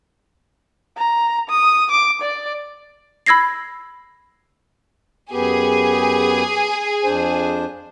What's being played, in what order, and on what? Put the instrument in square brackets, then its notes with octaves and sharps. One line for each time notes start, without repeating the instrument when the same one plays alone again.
[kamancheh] A#5
D#6
D6
D5
[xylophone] B5 E6 G#6 A#6 C7
[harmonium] F#2 B3 G4 [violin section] G#4
[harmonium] F2 D4 C5